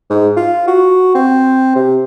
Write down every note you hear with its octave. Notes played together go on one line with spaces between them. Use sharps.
G#2
F4
F#4
C4
C3